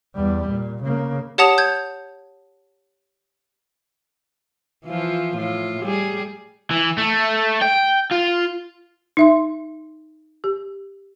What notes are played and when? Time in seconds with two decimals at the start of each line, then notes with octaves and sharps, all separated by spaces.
0.15 E2 G3
0.48 A#2
0.83 C#3 A#3
1.38 G4 C#5 F#5 A5 D#6 F7
1.58 G6 G#6
4.85 E3 F3 F4
5.37 A2 F4
5.82 G3 G#4
6.71 E3
6.98 A3
7.62 G5
8.11 F4
9.17 D#4 E5 C6
10.44 G4